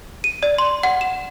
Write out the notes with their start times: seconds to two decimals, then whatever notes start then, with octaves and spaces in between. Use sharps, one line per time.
0.24 D#7
0.43 D5
0.58 C6
0.83 F#5
1.01 E7